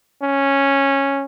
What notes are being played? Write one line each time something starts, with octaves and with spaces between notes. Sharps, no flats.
C#4